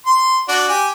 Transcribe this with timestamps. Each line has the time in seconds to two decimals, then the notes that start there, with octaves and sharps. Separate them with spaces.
0.06 C6
0.48 D4 F#4
0.69 G4 G#5